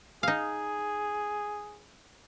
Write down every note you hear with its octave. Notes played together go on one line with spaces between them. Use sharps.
D#4 G#4 F5